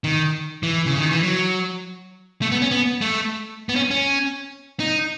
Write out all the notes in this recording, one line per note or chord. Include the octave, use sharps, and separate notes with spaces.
D#3
E3
C#3
D#3
E3
F#3
A3
B3
C#4
B3
A3
B3
C#4
C#4
D#4